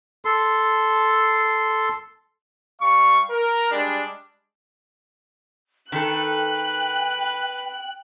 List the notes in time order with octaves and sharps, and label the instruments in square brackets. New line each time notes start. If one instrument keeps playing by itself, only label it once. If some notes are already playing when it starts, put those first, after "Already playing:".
[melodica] A4 C6
[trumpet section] G3 F5 C#6
A#4
G3 G#3 D4
[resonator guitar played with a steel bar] D#3 A4 [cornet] B4 [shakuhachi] G5 [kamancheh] F#6